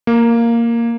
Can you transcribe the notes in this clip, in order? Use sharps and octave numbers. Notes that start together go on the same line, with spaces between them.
A#3